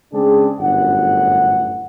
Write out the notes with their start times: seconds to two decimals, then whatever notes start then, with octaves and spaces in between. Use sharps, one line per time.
0.14 C#3 G#3 C4 D4 G#4
0.60 G1 F#2 A2 F#5